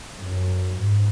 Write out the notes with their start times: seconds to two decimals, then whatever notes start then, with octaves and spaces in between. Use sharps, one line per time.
0.18 F#2
0.73 G#2